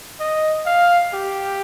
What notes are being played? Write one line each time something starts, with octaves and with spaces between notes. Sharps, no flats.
D#5
F5
G4